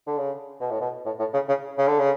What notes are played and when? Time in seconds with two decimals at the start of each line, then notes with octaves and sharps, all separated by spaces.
0.07 D3
0.18 C#3
0.60 B2
0.71 A2
0.81 B2
1.05 A2
1.19 A2
1.34 C#3
1.48 C#3
1.78 C#3
1.88 D3
1.99 C#3